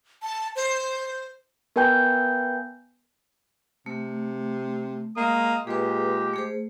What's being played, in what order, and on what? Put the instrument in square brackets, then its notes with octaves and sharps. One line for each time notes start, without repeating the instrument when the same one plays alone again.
[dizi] A5
C5
[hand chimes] B3 A#4 B4 G5 G#5 G6
[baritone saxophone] C3 [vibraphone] A3
[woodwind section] G#3 D#6 [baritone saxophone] A#3
[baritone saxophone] A#2 [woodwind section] G#3 G4 [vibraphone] G#4 B4
[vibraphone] A3 G#4 C5